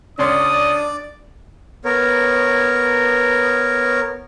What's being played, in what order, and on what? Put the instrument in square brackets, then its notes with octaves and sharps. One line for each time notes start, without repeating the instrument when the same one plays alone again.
[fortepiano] C#2 C#4 C6 [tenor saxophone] D4 [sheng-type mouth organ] D5 [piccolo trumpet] D#6
[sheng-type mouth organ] B3 A#4 C#5